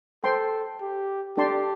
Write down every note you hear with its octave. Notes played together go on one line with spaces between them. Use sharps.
A4 C5 G5 C6
G4
D4 G4 A4 D5 A5 C6